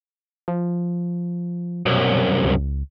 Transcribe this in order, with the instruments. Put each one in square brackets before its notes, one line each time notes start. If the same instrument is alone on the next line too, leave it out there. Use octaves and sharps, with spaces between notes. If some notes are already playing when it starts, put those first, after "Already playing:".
[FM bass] F3
[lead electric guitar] C2 F#2 [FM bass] B2
[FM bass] C#2